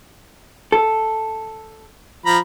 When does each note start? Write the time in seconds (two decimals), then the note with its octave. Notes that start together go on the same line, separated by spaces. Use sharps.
0.72 A4
2.26 F3 A#5 B5